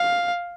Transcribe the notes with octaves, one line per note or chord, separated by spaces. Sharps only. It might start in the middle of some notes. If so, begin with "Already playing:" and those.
Already playing: F5